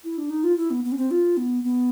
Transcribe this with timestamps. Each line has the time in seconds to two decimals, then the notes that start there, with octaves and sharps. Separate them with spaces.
0.04 E4
0.18 D4
0.30 D#4
0.44 F4
0.57 E4
0.70 B3
0.84 B3
0.92 C#4
0.97 C4
1.11 F4
1.37 B3
1.64 B3